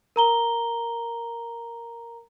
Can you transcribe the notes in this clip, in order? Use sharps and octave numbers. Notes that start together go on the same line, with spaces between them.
A#4 A#5 G7